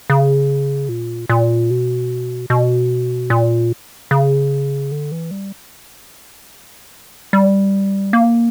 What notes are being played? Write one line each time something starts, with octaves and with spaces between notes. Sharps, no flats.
C#3
A#2
A#2
B2
B2
A#2
C#3
D3
E3
G3
G3
A#3